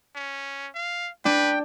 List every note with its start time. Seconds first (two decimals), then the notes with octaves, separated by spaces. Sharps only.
0.16 C#4
0.75 F5
1.25 D4 B4 G5